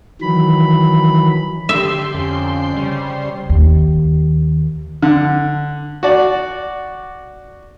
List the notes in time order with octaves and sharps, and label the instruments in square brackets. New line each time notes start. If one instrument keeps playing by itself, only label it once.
[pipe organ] D#3 E3 F#3 B5
[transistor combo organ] D3 G5 C6 [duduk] G4 [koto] E5
[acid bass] F2 [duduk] C#4
[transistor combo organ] C#3 C5 [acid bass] G3
[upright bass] D#2
[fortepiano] D3
F#4 D5